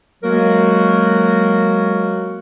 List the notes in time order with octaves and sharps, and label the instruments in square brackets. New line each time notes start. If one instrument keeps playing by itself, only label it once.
[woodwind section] F#3 G#3 A#3 F#4 A#4